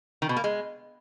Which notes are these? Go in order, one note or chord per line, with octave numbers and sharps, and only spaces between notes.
D#3
B2
A#3
G#3